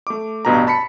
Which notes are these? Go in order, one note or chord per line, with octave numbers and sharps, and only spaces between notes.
A3 D6
A1 G2 B2 A#5
A5 B5 B6 C#7